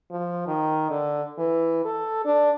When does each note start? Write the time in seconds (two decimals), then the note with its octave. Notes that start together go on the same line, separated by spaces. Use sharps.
0.11 F3
0.47 D#3
0.90 D3
1.38 E3
1.85 A4
2.25 D4